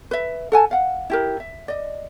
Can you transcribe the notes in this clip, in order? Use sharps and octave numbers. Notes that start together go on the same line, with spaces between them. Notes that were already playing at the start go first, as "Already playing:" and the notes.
B4 E5
A4 F#5 G#5 A5
F5 F#5
E4 G4 A#4
E5
D5 D#5